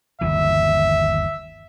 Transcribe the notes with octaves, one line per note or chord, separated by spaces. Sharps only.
G1 D#2 E3 E5